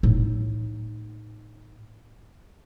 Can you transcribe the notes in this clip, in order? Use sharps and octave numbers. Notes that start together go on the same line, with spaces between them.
A2 D#4